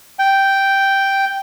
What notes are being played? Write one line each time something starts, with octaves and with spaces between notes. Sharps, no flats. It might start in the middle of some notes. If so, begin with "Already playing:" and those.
G5